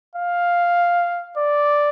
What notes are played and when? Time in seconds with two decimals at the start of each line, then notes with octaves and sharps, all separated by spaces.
0.15 F5
1.37 D5